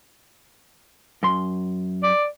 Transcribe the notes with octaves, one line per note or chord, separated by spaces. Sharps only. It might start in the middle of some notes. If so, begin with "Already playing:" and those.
F#2 C6
D5